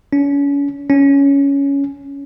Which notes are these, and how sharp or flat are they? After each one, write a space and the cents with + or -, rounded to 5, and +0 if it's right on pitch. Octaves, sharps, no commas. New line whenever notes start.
C#4 +35
C#4 +10